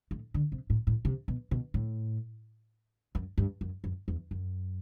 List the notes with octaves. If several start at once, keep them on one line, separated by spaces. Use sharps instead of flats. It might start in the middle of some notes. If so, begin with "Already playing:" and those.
A2
D3
C3
A2
A2
C3
B2
B2
A2
F#2
G2
F#2
F#2
E2
F#2